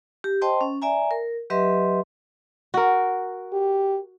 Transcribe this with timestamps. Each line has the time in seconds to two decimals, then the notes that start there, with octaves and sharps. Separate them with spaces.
0.24 G4
0.41 C5 D#5 G5 A5 C6
0.61 C#4
0.82 D5 E5 G#5 A#5
1.11 A#4
1.50 F#3 G4 B4 D#5 E5 C6
2.74 F#4 A#4
3.53 G4